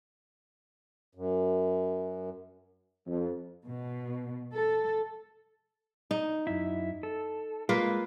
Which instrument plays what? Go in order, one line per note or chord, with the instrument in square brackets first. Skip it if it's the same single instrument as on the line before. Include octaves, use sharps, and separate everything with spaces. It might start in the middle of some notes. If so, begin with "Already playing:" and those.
[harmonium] F#2
[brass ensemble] F2
[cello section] B2
A4
[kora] D#4
[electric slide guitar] F#2 E4
A4
[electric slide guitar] G#3 [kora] A#3 F4 B4